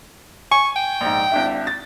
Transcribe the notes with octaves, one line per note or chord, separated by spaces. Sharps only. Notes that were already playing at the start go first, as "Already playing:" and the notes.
G#5 C#6
G5
A#1 G#2
G#1 D4 E4
A6